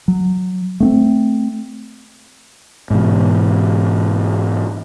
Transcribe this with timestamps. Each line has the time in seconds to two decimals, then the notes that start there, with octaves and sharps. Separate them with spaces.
0.08 F#3
0.80 A3 B3 C4
2.90 G#2 B2 E3